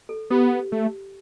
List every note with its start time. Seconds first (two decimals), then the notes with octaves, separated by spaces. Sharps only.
0.09 A4
0.30 B3 G4
0.72 A3